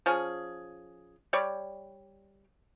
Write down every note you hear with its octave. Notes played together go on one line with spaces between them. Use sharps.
F3 C#4 G#4
G3 C#5 D5